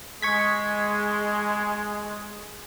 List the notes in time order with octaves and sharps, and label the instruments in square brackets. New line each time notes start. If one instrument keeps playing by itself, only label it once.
[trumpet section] G#3 [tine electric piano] C#6 G#6 B6